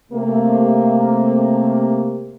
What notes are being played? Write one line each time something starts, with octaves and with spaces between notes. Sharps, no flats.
C3 A3 A#3